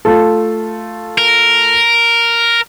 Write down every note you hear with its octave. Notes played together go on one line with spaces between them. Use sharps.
A3 F4 A4
A#4